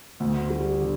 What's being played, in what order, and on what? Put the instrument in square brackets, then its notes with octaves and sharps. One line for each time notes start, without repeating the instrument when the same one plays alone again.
[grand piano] D2
G3
D3